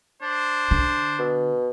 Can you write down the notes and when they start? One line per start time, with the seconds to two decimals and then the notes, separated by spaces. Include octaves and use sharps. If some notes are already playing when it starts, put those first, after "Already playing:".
0.22 D4 C5
0.71 D3
1.19 B2